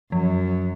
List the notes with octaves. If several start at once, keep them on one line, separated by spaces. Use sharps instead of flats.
F#2 F3